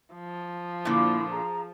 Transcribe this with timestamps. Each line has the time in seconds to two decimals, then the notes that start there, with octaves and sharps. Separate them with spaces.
0.14 F3
0.85 A#2 D3 A#3 E4
1.31 G#4 A#5